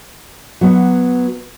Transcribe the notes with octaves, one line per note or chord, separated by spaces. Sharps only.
F#3 B3